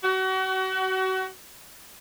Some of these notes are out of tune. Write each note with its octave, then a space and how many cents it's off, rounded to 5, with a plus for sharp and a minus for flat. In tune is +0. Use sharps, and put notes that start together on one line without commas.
F#4 +35